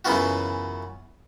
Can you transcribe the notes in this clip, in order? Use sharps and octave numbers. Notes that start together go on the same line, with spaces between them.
F#2 C#3 E3 B3 F4 F#4